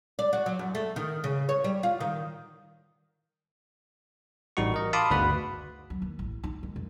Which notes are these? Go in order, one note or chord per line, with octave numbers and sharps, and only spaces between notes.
D5
F#4
F#3
F#2
A3
D#3
C#3
C#5
G3
F4
D#3
A1 G3 D#4 F#4 C#6
A#4 D#5
F5 A5 B5 C6 D6 D#6
G1 D2 F#4 B4 F#5 B5
F#3
D#2
A1
D#4
G#3
F#2